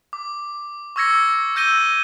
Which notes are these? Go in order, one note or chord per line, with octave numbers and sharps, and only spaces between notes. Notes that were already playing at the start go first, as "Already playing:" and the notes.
D6
C#6 D6 E6 G#6 A#6 C#7
E6 G6 A#6 D#7 G7